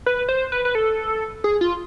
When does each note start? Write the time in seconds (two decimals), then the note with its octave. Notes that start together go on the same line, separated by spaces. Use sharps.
0.06 B4
0.29 C5
0.52 B4
0.65 B4
0.75 A4
1.44 G#4
1.61 F4